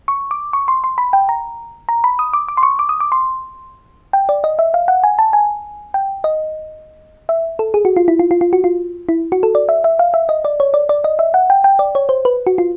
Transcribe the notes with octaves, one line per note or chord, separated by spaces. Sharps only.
C#6
D6
C#6
C6
C6
B5
G5
A#5
A#5
B5
D#6
D6
D6
C6
C#6
D6
D#6
D6
C6
G5
D5
D#5
E5
F5
F#5
G#5
A5
G#5
G5
D#5
E5
A4
G#4
F#4
F4
E4
F4
F4
F4
F#4
F4
E4
F#4
A4
D5
E5
E5
F5
E5
D#5
D5
C#5
D5
D5
D#5
E5
F#5
G5
G5
D5
C#5
C5
B4
F#4
F4